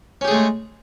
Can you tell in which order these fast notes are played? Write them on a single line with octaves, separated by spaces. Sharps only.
C#4 G4 G#4 A3 G#3